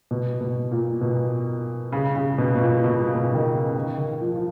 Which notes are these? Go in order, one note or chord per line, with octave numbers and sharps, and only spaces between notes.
B2
B2
A#2
B2
C#3
C#3
B2
B2
A#2
B2
B2
D#3
C#3
D#3
D#3
F3
F3